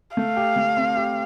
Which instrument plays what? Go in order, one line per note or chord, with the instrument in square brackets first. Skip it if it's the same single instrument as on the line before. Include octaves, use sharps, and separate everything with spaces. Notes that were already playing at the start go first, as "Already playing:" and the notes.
[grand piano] A3 [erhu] F5
[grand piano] G4
A3
C4
G4